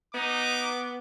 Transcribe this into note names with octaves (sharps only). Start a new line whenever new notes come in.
B3 D#4 D6